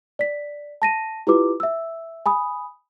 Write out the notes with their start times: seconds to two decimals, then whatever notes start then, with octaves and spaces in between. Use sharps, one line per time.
0.19 D5 B6
0.82 A5 A#6 D#7
1.27 E4 F4 G4 B4 D6
1.60 E5 E6
2.26 G#5 B5 D#6